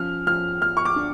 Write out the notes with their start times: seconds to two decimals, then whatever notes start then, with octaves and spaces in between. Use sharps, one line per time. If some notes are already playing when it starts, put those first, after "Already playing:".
Already playing: F3 C#4 F6
0.27 F3 F6
0.61 F3 F6
0.77 C#6
0.85 D6
0.96 D4